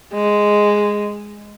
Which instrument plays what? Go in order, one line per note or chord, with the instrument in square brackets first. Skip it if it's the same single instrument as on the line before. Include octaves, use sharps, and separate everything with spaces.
[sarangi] G#3